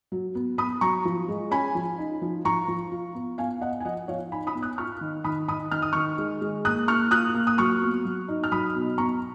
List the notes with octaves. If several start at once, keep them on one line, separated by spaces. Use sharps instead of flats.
F#3
B3
B3 B5 D#6
F#3 A#5 C#6
F3
G#3
C#4 G#5 B5
F3
D#4
F3
F3 A#5 C#6
F3
F4
B3
B3 F5 G#5
B3 D#5 F#5
G#5
F3 D#5 F#5
F3 C#5 F5
D#4 G#5 B5
B5 D#6
B3
D#6 F#6
F4 C#6 F6
D#3
D#3 B5 D#6
D#3 B5 D#6
D#3 F6
D#6
D#3 C#6 F6
G#3
G#3
A#3 D#6 F#6
A#3 C#6 F6
F4 D#6 F#6
A#3
D#6
F#3 C#6 F6
B3
F#3
D#4
F6
F#3 B5 D#6
B2
B3 A#5 C#6